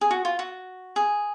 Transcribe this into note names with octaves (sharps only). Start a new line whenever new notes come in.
G#4
F#4
F4
F#4
G#4